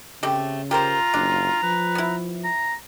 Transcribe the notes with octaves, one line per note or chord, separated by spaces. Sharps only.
C#3 A3 C4 G4
F4 G4 A#4 C5 A#5
F#1 D4
F3 B4
B3 E4
A#5